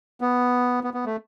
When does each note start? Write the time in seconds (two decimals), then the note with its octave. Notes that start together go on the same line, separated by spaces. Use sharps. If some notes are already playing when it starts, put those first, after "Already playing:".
0.21 B3
0.84 B3
0.94 B3
1.05 A3